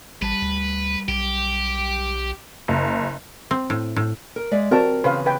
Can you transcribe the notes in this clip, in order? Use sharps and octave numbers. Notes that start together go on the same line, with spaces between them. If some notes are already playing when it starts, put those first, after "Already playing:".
A1 G3 B4 A5
D2
B1 G4
F#1
C4
A2
A2
A#4
G#3 D5 E5
C4 F#4 A#4 A5
E2 C#3 B4 C5 F5
B4 G5